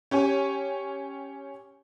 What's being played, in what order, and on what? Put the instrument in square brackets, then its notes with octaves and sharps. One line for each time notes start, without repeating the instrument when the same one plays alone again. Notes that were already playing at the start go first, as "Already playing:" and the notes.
[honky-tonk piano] C#4 G4 C#5 G#5